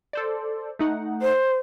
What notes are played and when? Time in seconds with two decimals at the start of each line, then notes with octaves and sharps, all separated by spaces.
0.13 A4 C5 D5
0.79 A3 D#4 F#5
1.21 C5